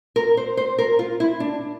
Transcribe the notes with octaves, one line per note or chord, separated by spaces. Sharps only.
A#4
C5
C5
A#4
F4
E4
D4